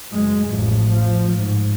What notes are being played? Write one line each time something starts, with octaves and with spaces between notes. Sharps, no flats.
F#1 G#3
A1 F2
F3
G#2